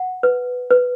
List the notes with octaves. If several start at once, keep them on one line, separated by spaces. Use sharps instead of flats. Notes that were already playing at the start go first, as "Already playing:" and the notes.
Already playing: F#5
B4
B4